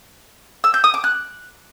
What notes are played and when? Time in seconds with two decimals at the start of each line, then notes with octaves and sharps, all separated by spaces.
0.64 E6
0.74 G6
0.84 D#6
0.94 D6
1.04 F#6